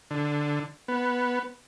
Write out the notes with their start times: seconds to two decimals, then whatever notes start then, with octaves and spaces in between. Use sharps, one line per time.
0.11 D3
0.88 B3